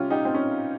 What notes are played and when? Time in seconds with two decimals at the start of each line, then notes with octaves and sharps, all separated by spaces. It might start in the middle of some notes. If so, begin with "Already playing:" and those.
Already playing: C3 G3 C#4 F4
0.10 D#4 G4
0.25 C4
0.34 C#4